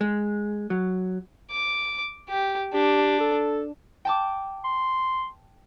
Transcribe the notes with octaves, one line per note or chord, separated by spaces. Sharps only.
G#3
F#3
D6
G4
D4 G4
A4
G5 A5 D6
C6